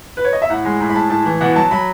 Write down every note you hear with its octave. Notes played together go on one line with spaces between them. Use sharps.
B4
C#5
D#5
E5
A2 F#5
G#3
A2
B5
G#3 A5
A2 A5
E3
B2 F#5
F#3 A5
F#3 B5